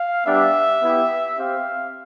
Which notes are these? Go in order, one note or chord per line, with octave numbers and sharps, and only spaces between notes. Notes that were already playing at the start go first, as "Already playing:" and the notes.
Already playing: F5
G3 B3 D4 G4 E5
B3 E4 G4
C4 G4 F5